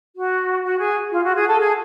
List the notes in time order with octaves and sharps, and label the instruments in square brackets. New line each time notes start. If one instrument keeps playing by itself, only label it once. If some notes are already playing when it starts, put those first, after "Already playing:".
[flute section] F#4
F#4
G#4
F4
F#4
G#4
A4
G#4